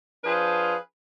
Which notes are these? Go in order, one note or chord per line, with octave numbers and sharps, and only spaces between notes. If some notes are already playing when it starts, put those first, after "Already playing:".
F3 D4 G#4 B4 C5 F5